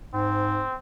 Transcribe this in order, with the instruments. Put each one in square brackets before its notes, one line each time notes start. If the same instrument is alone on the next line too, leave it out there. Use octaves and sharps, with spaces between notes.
[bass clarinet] G#2 [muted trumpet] C4